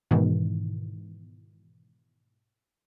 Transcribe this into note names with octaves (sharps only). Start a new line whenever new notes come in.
G#2 B2 D#3 E3